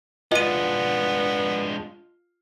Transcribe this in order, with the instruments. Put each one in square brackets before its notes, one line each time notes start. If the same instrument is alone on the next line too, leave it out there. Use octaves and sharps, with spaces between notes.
[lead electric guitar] G#3 D4 [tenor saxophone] B3 [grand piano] F4 [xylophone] D#5 D#7